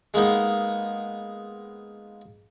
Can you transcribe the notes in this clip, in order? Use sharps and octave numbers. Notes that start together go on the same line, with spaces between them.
G#3 A#3 B3 D#4